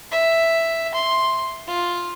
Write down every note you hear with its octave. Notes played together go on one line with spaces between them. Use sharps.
E5
C6
F4